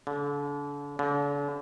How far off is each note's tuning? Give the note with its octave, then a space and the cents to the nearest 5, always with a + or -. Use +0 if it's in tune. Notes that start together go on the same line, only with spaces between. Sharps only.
D3 -35
D3 -40